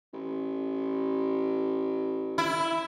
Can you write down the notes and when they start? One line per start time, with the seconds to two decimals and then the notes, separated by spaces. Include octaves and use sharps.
0.13 A1
2.38 E4